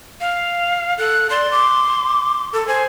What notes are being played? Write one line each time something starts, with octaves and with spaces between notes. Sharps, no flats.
F5
A4 F#6
D5 C6
D6
A4
C5 G#5